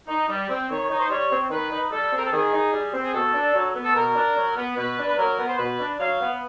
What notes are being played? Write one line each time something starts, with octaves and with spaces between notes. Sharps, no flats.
D#4
G3
C4
D#3 C#5
D#4
C5
G3 C#5
C4
D#3 B4
D#4
G3 A4
C4 A#4
A4
D#3 G#4
D#4
G3
C4
G#4
B2 A4
D4
F#3
B3
A4
B2 A#4
D4
F#3
B3
B2 B4
D4
B4
F#3 A#4
B3
C5
B2 B4
D4
F#3 F5
B3